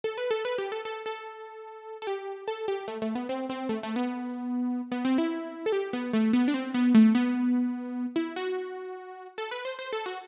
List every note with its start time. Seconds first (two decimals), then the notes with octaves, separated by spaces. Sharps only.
0.04 A4
0.18 B4
0.31 A4
0.45 B4
0.58 G4
0.72 A4
0.85 A4
1.06 A4
2.02 A4
2.07 G4
2.48 A4
2.68 G4
2.88 A3
3.02 A3
3.15 B3
3.29 C4
3.50 C4
3.69 A3
3.83 A3
3.96 B3
4.92 B3
5.05 C4
5.18 E4
5.66 A4
5.72 G4
5.93 B3
6.13 A3
6.33 B3
6.48 D4
6.54 C4
6.74 B3
6.94 A3
7.15 B3
8.16 E4
8.36 F#4
9.38 A4
9.51 B4
9.65 C5
9.79 C5
9.93 A4
10.06 F#4